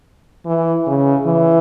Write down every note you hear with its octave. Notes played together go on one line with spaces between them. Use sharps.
E3
C#3
E3